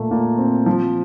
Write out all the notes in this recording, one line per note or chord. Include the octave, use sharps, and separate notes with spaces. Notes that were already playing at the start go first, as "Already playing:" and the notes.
Already playing: A#2 A3
A#2
C4
F3